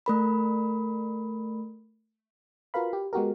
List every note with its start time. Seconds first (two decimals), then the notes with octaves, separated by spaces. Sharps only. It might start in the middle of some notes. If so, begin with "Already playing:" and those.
0.06 A3 A#4 B5
2.74 F4 F#4 A#4 B4 F5 B5
2.93 G4
3.13 G#3 B3 F#4 G4 A#4